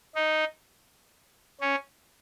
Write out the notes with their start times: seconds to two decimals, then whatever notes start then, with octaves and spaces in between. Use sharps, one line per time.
0.15 D#4
1.61 C#4